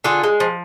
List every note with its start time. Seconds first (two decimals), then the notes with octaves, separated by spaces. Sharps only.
0.04 D3 F4 G#4
0.24 G#3
0.40 F3